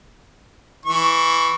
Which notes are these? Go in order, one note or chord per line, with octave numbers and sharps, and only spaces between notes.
E3 C#6